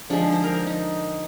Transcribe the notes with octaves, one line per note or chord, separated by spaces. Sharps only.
D3 F3 G#3 D4
D#4
C5
A#4
A#4
D#4